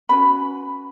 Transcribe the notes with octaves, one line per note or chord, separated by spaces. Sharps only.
C#4 F#4 B4 B5